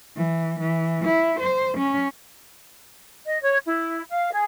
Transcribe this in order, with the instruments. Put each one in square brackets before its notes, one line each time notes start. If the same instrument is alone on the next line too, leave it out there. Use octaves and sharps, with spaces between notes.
[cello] E3
E3
E4
C5
C#4
[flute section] D#5
C#5
E4
F5
G#4